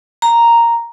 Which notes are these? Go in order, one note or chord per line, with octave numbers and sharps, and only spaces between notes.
A#5